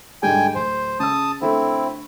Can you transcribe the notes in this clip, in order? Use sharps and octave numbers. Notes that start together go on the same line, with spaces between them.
G#2 D3 G3 G5 G#5
D1 C5
C#3 A5 D#6 E6
D3 A3 C4 E4